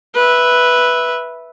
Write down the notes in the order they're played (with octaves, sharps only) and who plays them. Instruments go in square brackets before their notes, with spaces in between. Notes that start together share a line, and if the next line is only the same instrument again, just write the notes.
[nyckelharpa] B4 E5